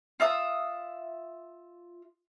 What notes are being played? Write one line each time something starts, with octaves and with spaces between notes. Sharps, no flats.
F4 E5 D#6